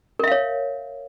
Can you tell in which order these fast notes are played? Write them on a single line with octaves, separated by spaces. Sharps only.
A#4 E5 F5 C#5